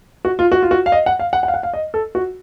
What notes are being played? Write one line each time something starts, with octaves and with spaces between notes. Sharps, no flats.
F#4
F4
F#4
F4
F#4
F5
D#5
F#5
F5
F#5
F#5
F5
F#5
F5
D#5
A4
F#4